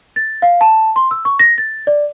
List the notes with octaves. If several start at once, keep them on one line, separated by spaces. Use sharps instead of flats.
A6
F5
A5
C6
E6
C#6
A#6
A6
D5